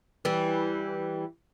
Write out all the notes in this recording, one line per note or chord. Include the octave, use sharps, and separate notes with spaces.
E3 G3